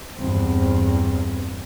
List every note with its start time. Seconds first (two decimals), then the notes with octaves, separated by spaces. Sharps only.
0.17 E2 G2 C4